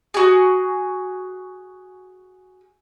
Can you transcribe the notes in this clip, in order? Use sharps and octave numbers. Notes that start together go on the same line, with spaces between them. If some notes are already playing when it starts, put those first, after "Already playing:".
F#4 G#4